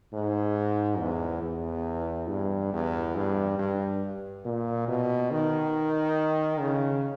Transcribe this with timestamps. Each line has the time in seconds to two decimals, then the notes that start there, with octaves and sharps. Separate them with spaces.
0.13 G#2
0.99 E2
1.43 E2
2.29 G2
2.73 E2
3.16 G2
3.59 G2
4.45 A#2
4.88 B2
5.31 D#3
6.60 C#3